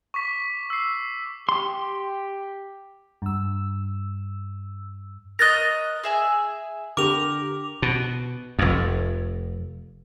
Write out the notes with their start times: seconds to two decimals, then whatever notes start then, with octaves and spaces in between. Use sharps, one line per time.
0.14 C#6 D6 B6
0.70 E6 C7
1.49 G4 C6
3.22 G2 E6
5.39 A#4 C#5 D#5 F#6 A6 A#6
6.04 G#4 E5 G#5
6.97 D3 G4 A#4 D6 F7
7.82 B2
8.59 F1 F2